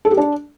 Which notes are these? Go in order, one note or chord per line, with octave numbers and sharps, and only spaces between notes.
A4
G4
D4